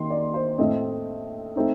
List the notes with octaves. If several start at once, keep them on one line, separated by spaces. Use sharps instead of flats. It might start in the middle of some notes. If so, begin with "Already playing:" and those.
Already playing: D#3 A#3 D#4 C6
D5
C5
A2 A3 C4 D#5
A3 C4 D#4